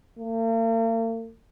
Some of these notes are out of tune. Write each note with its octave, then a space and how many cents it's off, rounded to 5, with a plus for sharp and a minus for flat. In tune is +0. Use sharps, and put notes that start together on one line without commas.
A#3 -45